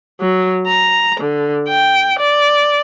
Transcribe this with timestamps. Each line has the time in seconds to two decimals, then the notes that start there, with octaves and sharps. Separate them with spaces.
0.21 F#3
0.67 A#5
1.20 D3
1.69 G5
2.19 D5